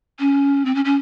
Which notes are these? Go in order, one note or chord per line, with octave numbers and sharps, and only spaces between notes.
C#4
C4
C#4
C#4